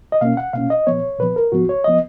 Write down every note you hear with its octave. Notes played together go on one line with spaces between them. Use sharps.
D#5
B2 A#3 C#4 F5
F#5
B2 A#3 C#4 F5
D#5
A#2 F3 B3 C#5
A#2 F3 B3 B4
A#4
G#2 F3 B3 F#4
C#5
F3 B3 D#5